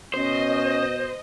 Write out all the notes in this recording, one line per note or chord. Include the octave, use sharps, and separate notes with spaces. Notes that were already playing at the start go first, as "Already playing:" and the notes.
B2 C#4 C5 D#5